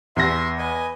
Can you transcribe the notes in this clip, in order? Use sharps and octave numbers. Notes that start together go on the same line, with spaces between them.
E2 E5 C6 A#6
B4 D#5 G#5